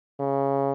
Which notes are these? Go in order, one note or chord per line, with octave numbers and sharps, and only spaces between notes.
C#3